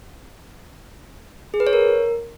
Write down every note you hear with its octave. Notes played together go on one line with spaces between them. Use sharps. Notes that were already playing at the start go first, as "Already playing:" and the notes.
G#4
B4
C#5
A#4